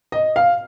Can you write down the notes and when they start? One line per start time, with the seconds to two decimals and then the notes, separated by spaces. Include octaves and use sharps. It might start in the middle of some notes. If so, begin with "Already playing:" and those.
0.12 D#5
0.36 F5